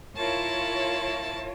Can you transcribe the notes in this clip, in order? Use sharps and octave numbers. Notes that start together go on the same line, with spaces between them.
E4 F4 A#4 C#5 A5